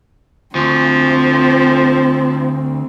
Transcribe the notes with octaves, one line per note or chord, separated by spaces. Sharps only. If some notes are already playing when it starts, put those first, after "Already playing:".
D2 F3 C4